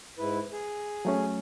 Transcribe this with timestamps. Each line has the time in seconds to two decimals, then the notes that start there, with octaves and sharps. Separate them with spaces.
0.19 G#2 E4 B4
0.52 G#4
1.05 F#3 A3 C#4